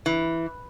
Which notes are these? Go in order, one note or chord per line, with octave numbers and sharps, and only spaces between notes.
E3